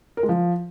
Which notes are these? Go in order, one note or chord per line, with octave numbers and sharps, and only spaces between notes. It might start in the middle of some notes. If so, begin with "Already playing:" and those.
A#4
G#3
F3